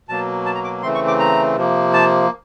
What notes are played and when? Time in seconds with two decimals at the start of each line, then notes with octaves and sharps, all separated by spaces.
0.09 B2 F#3 A#3 A5
0.46 A5
0.55 A#5
0.64 D6
0.83 C#3 E3 A3 C4 C6
0.95 C#6
1.07 D6
1.20 A#5
1.57 C3 F3 A#3
1.94 A5